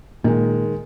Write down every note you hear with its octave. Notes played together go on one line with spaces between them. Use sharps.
A#2 D#3 G#3